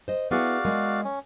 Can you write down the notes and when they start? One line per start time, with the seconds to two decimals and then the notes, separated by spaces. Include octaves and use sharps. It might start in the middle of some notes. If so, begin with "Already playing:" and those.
0.08 C5 D#5
0.31 B3 E4 F#4 G#4 D5 F5
0.65 G#3 A#4
1.04 C#4